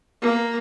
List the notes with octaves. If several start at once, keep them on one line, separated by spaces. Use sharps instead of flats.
A#3